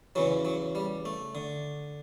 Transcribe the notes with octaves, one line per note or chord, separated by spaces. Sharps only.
E2 C#3 E3 F#3
F#3
G3
A3
D3